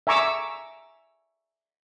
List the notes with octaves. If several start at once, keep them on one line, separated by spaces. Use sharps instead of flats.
E5 G#5 A#5 C#6 D6 E6